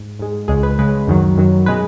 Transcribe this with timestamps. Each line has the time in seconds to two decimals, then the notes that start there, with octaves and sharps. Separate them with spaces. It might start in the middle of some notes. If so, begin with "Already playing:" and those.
Already playing: G#2
0.19 G#2 G#3
0.48 C#2 C#3 G#3 G#4
0.63 B4
0.79 C#2 C#3 G#3 B4
1.08 F#2 D#3 F#3
1.37 F#2 D#3 F#3
1.66 B2 G#3 B4